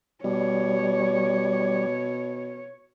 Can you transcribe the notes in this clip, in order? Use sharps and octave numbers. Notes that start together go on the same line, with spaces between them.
B2 G3 C#5